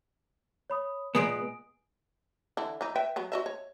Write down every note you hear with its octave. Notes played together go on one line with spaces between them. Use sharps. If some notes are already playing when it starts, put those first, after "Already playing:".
C#5 B5 D#6
A#2 G#3 B3 G#5 D#6 D7
D3 E3 E4
E3 D#4
B4 E5 G5
F#3 B3
F#4 D#5 E5
C#5